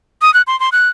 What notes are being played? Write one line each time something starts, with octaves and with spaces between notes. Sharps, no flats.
D#6
F#6
C6
C6
F#6